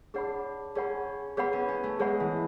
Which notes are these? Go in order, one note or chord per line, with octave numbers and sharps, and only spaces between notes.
D4 G#4 C#5 F#5 B5
C#4 G#4 C#5 F#5 B5
B3 G#4 C#5 F#5 B5
C#4
C#4
A3
G#3 G#4 C#5 F#5 B5
E3